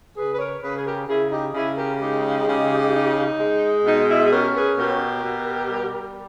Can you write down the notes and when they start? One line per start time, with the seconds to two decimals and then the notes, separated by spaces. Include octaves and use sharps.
0.16 C#3 G#4 B4
0.34 B4
0.38 A#4 C#5
0.61 C#3 G#4 B4
0.76 G#4
0.85 G4 A#4
1.08 C#3 E4 G#4
1.31 D#4 G4
1.54 C#3 E4 G#4
1.77 G4 A#4
2.01 G#3 D#4 G4
2.47 C#3
2.94 D#4
3.39 G#3
3.85 B2 D#4
4.09 E4
4.25 G#4
4.31 C#4 G4 A#4
4.54 G#4 B4
4.77 B2 G4 A#4
5.23 B2
5.70 G3